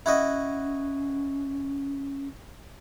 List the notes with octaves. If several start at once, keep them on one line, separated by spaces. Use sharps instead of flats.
C#4 E4 F#4 D#5